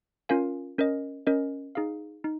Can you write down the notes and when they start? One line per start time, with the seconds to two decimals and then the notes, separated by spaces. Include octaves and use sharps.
0.29 C#4 F4 A#4 F5 G#5
0.78 C#4 A#4 D#5
1.27 C#4 A#4 D#5
1.75 D#4 G#4 F5
2.24 D#4